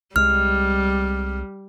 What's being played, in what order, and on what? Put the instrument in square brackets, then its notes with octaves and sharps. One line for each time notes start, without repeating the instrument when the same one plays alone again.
[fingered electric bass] C2 G#3 [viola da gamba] G3 [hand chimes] F6